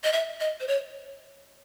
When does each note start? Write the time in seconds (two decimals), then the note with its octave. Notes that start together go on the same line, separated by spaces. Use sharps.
0.04 D#5
0.13 E5
0.40 D#5
0.60 C5
0.68 C#5